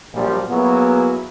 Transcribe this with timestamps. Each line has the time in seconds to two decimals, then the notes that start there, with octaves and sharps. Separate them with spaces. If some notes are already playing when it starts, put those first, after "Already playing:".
0.14 A#1 F#2 A#2 F3 G3
0.49 F#3 A#3 B3 E4 F#4 G#4